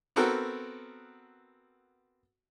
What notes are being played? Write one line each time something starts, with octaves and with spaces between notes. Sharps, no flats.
B3 C4 F#4 A4 A#4